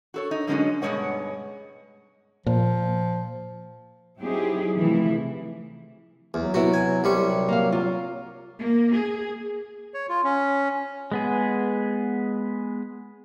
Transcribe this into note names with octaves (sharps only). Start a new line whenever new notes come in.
F#4 A4 C#5
D#4
F#2 D3 G#3 C#4 D#4 F#4
G2 B2 F3 G#3 C#5 F#5
A#2 F3
F#3 C4 D#4 E4 G4 G#4
C3 E3 F3 A3 E4
E2 F#3
C3 B3 E4 F#4
G#5
C2 F#3 G3 C#6
A#3 F5
F4 C#5
A#3
G#4
C#5
F4
C#4
G#3 B3 G#4